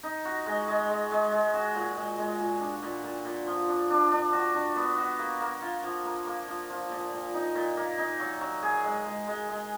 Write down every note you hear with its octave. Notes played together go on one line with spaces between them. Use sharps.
D#4
F#4
G#3
G#3
G#3
G#3
G#3
F#4
A#2
G#3
G#3
A#2
D4
A#2
A#2
A#2
F3
D4
D4
D4
F#4
D4
B3
F#4
A#3
A#3
F4
F3
A#3
A#3
F3
F3
A#2
A#2
D#4
A#2
A#3
D#4
F#3
F#3
G#4
G#3
G#3
G#3
G#3